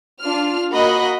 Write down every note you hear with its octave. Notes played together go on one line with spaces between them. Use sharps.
D4 F4 F6
A#3 F#4 D#5 B5 F#6